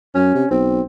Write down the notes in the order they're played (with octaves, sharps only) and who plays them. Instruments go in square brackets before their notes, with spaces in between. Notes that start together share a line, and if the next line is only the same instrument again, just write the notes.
[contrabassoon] F#2 [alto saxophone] C#4
[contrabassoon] C3
[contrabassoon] B1 [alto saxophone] C4